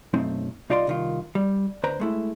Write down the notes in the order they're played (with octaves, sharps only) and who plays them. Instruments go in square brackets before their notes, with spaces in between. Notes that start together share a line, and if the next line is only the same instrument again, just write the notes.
[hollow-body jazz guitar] B1 F#2 A3 C4 D#4
C2 D#4 F4 D5 F5 C6
C2 D#3 F4
G3
D2 B4 C5 A#5
G#3 A3 E4